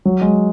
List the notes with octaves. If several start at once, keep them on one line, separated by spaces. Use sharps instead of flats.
F#3
G#3